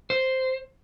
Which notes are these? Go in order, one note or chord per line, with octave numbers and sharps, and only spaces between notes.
C5